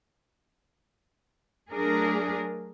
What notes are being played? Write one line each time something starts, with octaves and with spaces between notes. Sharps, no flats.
F#3 A3 D4 G#4 A#4